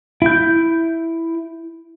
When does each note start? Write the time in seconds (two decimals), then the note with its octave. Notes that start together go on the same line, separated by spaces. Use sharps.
0.22 E4 G6